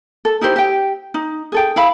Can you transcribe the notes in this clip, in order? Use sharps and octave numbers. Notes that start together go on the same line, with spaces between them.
A4
D#4 E4 G4 C5
G4 G5
D#4
G#4 A4 G5
E4 F5 B5